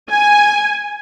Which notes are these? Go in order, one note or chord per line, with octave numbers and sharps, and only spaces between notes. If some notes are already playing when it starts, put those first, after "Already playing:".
G#5